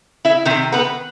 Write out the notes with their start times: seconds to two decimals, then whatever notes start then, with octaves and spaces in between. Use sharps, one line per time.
0.25 E4 E5
0.45 C3 D#3
0.72 B3 B4